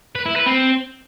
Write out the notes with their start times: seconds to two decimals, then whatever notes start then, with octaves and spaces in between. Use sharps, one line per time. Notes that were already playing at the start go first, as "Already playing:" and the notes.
0.16 B4
0.26 E4
0.36 B4
0.46 C4